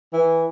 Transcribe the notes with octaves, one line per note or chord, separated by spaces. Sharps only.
E3